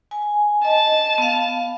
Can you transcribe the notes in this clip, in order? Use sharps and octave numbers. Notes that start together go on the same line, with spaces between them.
G#5
D#5 A5
B3 F5